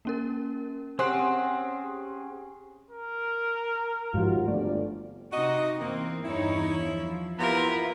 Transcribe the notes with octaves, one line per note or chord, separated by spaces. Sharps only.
A#3 C#4 A#4
C4 C#4 G4 G#4 F#5
A#4
D#2 G#2 F3 F4 F#4
G1 F2 A3 D5
C3 D#4 F#4 D#5
E2 A#3 C4
G2 D#4 E4 C#5
F3
C3 A#3 B3 E4 F4 A#4 B4